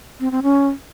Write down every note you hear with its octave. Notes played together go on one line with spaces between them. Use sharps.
C4
C4
C#4